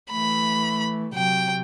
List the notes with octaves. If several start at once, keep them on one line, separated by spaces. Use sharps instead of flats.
E3 A3 B5
C3 F#3 G5